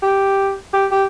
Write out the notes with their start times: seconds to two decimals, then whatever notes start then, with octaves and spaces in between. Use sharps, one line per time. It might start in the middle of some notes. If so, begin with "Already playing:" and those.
0.02 G4
0.73 G4
0.91 G4